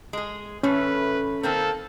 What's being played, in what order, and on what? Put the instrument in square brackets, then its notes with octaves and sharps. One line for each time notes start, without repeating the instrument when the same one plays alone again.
[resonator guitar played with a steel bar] G#3 G#4
[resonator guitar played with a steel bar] A2 E3 A3 [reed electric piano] C#4 [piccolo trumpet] B4
[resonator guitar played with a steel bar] D#3 A#3 C4 [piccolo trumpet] A4